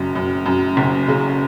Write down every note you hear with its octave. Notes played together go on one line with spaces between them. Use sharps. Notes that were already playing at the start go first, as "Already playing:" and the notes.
Already playing: F#1 F#2
F#2
F#2
F#1
C#3